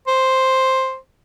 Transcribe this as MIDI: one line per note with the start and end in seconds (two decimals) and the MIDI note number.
0.07 0.97 72